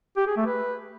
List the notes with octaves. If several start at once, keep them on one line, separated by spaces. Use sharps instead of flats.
G4
G#4
A3
B4